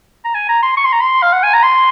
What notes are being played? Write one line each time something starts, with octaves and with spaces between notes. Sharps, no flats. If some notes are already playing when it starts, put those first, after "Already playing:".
A#5
G#5
A#5
C6
C#6
C6
A#5
C6
F5
F#5
G#5
A#5
C6